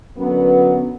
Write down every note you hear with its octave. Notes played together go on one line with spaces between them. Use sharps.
F#2 D3 F#3 B3